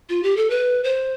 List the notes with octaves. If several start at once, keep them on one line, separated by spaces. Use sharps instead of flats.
F4
G4
A4
B4
C5